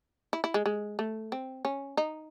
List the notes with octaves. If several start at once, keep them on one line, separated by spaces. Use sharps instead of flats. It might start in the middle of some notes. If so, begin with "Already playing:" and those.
E4
E4
G#3
G#3
A3
C4
C#4
D#4